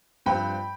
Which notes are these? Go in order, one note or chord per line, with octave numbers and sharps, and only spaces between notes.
G2 F3 C4 G5 B5